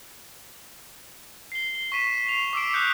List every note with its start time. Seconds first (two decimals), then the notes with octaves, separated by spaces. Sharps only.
1.52 C7 G7
1.75 G7
1.92 C#6 B6 D#7 E7
2.27 C7 F7
2.53 D6 E6 C7 D7
2.73 D#6 F#6 G6 C#7